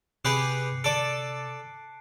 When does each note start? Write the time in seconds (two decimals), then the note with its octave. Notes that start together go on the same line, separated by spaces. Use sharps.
0.25 C3 G4 G#4 B4 F#6 C7 C#7
0.84 A4 D5 A5 D7